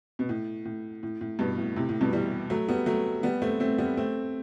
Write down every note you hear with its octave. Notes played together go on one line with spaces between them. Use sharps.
B2
A2
A2
A2
A2
G2 B2
A2
A2 C3
A2
G2 B2
E3 G3
F#3 A3
G3 B3
F#3 A3
G3 B3
A3 C4
A3 C4
G3 B3
A3 C4